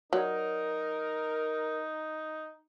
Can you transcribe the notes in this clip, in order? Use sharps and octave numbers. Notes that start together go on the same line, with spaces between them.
F#3 D#4 A#4 C#5 D5